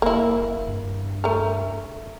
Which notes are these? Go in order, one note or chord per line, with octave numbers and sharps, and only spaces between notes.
F#1 A#3 E4
G2
A3 A#4